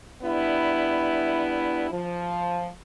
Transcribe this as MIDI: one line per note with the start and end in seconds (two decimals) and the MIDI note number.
0.22 1.91 55
0.22 1.91 59
0.22 1.91 62
0.22 1.91 64
1.92 2.68 53